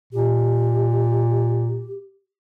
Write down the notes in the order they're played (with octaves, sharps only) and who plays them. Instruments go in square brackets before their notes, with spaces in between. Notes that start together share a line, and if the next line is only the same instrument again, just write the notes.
[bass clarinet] A#2 [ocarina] G4